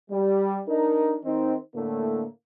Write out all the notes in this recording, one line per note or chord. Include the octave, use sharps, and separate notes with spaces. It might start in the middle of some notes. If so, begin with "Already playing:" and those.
G3
D4 D#4 A#4
D#3 C4 D#4
A2 D3 A3 A#3